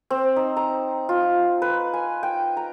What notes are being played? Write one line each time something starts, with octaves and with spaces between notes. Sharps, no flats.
C4
D#4
A#5
F4
B4
G#5
G5
A#5